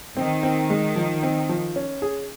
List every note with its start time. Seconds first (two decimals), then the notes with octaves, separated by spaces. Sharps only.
0.16 D#3 C4
0.43 C4
0.70 G#3
0.96 F3
1.23 C4
1.49 F3
1.76 C#4
2.02 G#4